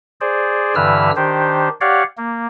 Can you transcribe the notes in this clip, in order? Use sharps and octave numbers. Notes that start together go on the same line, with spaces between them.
G#4 C5 D5
G2 D3 E3 B4 E6 F6
D#3 D4 G4 C5
G4 C#5 D5 F5 F#5
A#3